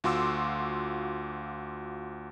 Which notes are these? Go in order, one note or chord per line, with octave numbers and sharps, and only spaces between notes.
D2 F4 F#4 C6 D6 E6